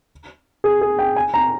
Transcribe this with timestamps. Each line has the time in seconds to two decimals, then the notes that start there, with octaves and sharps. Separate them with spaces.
0.64 G#4
0.81 G#4
0.99 G5
1.16 G#5
1.34 A#5